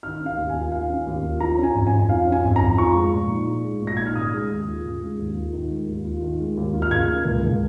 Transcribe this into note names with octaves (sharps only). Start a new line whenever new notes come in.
D#3 F6
C#4
F5
D#2
G#5
F4
D#3 F5
C#4
D#2
F4
F3 A#5
C#4
G#5
F2
G#5
F2
F3 F5
C#4
G#5
F2
F2 A#5
F3 C#6
G#3
A#2
D#4
F3
G#3
A#2
A#6
D#4 G#6
F6
C#3 D#6
G#3
D#2
F4
C#3
G#3
D#2
F4
D#3
G#3
D#2
F4
D#3
G#3
D#2
F4
F6
C#3 G#6
A#3
C#2
C#2